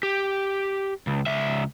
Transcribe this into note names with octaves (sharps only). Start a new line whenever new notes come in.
G4
C#2
C#2 E5